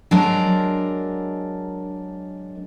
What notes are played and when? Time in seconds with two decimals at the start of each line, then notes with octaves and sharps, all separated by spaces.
0.11 F#3 G#3 D4 A#4 A#5